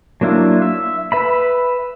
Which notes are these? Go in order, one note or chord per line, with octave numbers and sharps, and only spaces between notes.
F#3 A#3 D4 E4 F4
E5
B4 E5 B5